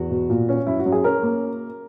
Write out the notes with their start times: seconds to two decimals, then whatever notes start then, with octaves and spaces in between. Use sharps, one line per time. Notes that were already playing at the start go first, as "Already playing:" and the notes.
Already playing: E2 F#4
0.11 B2
0.30 A#2
0.49 C#4
0.67 F#2 E4
0.79 F#4
0.86 F#2
0.92 G#4
1.04 C#4 A#4
1.23 A#3